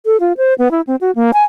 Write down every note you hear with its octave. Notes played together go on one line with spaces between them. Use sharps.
A4
F4
C5
B3
E4
C4
F#4
A#3
G#5